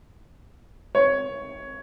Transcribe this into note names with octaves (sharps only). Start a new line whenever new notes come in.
C#5